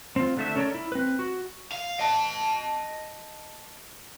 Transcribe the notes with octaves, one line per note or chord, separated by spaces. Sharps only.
C4 F4
D3 A3 E5
C#4 A4 A#4 C#5 D5
E4
C4 B4
F#4
F5
D#5 A5